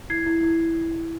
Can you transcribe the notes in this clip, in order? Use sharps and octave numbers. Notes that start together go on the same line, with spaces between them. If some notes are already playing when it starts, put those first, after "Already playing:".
E4 G#6 C7
E4
E4